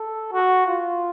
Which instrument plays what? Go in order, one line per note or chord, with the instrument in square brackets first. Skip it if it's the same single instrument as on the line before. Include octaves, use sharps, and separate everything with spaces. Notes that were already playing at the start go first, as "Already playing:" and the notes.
Already playing: [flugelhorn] A4
F#4
F4